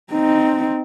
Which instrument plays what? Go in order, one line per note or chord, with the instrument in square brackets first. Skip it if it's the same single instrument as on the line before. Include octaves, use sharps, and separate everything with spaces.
[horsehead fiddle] C4 D#4